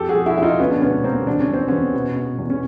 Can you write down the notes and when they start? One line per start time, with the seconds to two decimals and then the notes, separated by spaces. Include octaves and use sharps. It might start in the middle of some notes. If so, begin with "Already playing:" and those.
Already playing: F2 G4 A4
0.09 F#4 G#4
0.15 F2
0.26 E4 F#4
0.37 F2 E4
0.42 D#4 F4
0.59 D2 B3 C#4
0.71 D4
0.81 E1 B3 C#4
1.04 D2 A#3 C4
1.26 E3 D4
1.40 C#4
1.49 E2 C4
1.68 E3 B3 C#4
1.94 B2
2.16 B2
2.38 E2
2.50 C#4